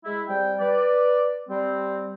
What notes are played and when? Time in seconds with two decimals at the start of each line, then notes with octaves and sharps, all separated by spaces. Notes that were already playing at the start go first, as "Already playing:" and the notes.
0.03 G#3 E4
0.28 C3 G3 G5
0.58 B4 D5
1.48 G3 C4